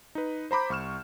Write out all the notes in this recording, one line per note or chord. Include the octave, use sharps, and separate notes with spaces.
D#4 B4
C5 A#5 B5 D6 G6
C2 C#6 F6 E7